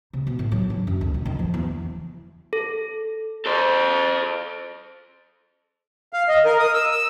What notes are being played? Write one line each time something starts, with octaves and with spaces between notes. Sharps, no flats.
C3
B2
A2
F#3
D4
F#2
D2
A#2
D#3
F3
E2
A4
A4 C5
F5
D#5
A#4
D#6
E6
E6